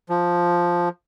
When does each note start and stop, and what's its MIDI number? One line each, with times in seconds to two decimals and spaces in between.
0.10 0.89 53